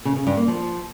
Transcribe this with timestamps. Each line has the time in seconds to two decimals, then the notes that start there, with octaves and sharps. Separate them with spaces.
0.05 C#3
0.16 C#3
0.27 G2
0.37 A#3
0.48 F3